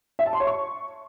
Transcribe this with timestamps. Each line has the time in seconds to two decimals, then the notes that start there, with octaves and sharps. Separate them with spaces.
0.19 E5
0.26 A5
0.33 C6
0.40 C#5
0.47 C#6